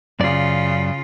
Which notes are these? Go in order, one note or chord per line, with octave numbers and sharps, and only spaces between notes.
F#2 C#3 F4 D5